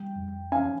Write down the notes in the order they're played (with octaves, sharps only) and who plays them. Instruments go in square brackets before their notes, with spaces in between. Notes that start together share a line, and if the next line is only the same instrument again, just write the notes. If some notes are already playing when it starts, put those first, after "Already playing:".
Already playing: [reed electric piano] G3 [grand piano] G5
[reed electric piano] F2
[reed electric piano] C#4 [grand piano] F5 G#5